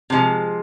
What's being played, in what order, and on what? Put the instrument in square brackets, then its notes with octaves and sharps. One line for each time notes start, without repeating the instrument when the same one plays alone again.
[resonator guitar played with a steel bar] C3 F3 G#3